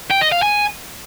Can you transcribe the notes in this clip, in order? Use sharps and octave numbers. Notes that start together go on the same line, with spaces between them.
G5
D#5
F5
G#5